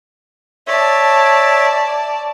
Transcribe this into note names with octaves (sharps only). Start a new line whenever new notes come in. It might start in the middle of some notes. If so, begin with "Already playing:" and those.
C#5 D5 E5 A5